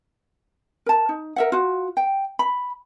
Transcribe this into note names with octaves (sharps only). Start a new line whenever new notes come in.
A#4 A5
D#4
A#4 E5 F#5
F4 F#4
G5
B5